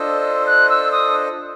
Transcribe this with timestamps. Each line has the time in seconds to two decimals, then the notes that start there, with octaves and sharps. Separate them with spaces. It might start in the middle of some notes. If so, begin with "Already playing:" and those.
Already playing: D4 F4 A4 C5 D#5 E6
0.46 F#6
0.69 E6
0.92 D#6